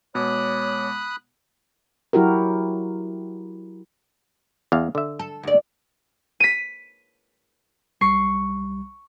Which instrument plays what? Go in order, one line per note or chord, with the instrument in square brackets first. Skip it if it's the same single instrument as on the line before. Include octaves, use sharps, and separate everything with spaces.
[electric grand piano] B2 [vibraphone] G#3 D6 [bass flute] C#5 [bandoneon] B5 D#6 F#6
[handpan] F#3 E4 F#4 G4 A#4
[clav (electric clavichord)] E2 F5
D3 E5
[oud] A4
D2 D5
[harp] B6 D#7
[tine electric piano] B1 G3 [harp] C#6 C7